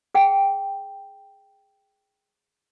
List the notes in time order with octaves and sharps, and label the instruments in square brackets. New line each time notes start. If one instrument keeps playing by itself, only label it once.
[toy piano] G#4 F#5 G5